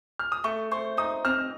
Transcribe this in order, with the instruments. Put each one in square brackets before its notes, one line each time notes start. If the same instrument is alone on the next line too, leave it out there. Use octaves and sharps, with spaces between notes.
[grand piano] F6
D#6
[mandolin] A3 [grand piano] C#6
[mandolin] C5 [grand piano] C#6
[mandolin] D#4 [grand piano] D#6
[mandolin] C4 [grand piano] F6